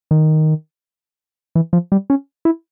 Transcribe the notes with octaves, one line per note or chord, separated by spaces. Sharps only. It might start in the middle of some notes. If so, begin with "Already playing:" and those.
D#3
E3
F3
G3
C#4
E4